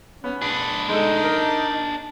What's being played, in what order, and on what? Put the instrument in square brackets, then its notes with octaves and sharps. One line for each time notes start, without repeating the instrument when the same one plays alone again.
[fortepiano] B3 [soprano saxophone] C#4
[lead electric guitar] D4 G#4 [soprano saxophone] B5
[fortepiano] G#3 A4 [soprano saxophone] D#4
[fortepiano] A#4